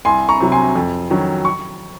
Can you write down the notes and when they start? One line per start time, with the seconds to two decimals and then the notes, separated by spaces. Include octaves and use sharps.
0.05 C2 G#5 C6
0.29 A#5 C#6
0.40 C3 F#3
0.52 G#5 C6
0.76 F2
1.10 D#3 F#3 C#4
1.45 C#6